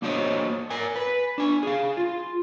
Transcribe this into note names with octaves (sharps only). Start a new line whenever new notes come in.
A#3 D4 F#4 C5 C#5 D#5
A#4 G#5
B4
D4 G#5
G#4 F5
F4